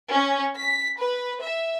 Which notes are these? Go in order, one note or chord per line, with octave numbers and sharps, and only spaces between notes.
C#4
B6
B4
E5